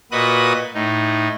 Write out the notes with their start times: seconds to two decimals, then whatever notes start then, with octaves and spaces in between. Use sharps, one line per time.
0.12 A#2 F#4 B4 D#5 D#6 F#6
0.74 A2 D#4